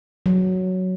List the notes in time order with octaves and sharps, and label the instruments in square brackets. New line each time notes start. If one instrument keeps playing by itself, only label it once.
[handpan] F#3